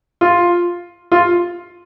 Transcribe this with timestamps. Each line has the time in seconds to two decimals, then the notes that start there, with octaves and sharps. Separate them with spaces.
0.21 F4
1.12 F4